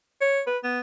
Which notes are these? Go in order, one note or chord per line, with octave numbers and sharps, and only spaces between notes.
C#5
B4
B3